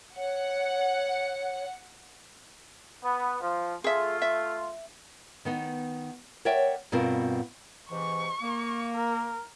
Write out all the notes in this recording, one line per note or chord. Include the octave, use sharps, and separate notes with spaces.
C#5 F#5
B3
F3
A3 F4 G#4 E5
E5
D#3 B3 D#4
A#4 C#5 D5 E5 F#5 G5
G2 B2 B3 C4 F4 A#4
G#2 C3 E3 C#6
A#3
A#4